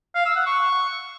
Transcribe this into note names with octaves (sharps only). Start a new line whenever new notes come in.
F5
E6
F#5
C#6